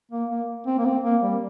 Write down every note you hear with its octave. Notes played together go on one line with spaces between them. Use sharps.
A#3
A#3
C4
A#3
C4
A#3
G3